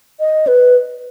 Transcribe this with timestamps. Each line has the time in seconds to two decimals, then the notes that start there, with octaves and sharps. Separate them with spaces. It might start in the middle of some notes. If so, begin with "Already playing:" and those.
0.20 D#5
0.47 B4